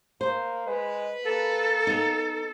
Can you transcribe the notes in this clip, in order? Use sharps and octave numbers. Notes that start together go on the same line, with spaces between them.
A#3 C5
G#3 B4
A#3 A4
B3 D#4